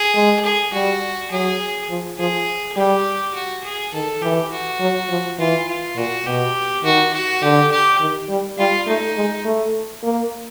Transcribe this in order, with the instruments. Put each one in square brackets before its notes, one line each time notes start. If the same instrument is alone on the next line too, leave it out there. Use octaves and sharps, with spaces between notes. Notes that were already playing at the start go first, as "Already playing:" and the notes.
Already playing: [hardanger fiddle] G#4
[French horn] G#3
[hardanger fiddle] G#4
[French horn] G3 [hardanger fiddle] F#4
[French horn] F#3 [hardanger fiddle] G#4
[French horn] F3
[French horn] F3 [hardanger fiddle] G#4
[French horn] G3 [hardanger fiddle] G4
[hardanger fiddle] F#4
G#4
[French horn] D#3 [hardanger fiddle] A4
[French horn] E3 [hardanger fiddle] G4
[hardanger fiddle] F#4
[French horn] F#3
F3
[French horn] E3 [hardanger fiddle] F4
[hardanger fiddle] F4
[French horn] A#2 [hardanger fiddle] F#4
[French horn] B2 [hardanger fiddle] G4
[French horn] D#3 [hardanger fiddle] F#4
[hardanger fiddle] F#4
[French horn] D3 [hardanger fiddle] G4
[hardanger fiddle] G4
[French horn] D#3
G3
[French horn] G3 [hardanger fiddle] F4
[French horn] A3 [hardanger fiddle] D#4
[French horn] G#3
A3
A#3